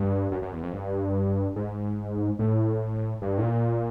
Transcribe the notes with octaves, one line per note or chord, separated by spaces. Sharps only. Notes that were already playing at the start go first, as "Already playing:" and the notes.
Already playing: G2
F#2
F#2
E2
F2
G2
G#2
A2
G2
A2
A#2